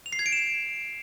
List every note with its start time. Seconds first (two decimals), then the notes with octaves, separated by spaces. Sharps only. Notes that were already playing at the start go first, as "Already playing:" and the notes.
0.06 F7
0.13 C7
0.19 G#6
0.26 D7
0.32 E7